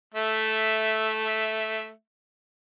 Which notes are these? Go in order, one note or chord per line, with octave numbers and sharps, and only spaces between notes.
A3 E5